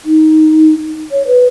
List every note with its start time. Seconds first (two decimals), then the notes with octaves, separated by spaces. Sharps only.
0.05 D#4
1.12 C#5
1.27 B4